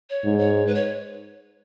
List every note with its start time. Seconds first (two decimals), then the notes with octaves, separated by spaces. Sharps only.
0.10 C#5
0.24 G#2
0.38 C#5
0.67 B4
0.75 C#5